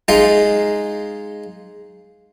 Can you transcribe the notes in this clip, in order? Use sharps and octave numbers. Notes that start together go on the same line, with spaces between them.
G#3 D#4 F4